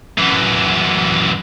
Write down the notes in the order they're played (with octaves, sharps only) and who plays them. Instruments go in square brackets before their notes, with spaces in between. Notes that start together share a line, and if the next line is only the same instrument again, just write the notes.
[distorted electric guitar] F#2 E3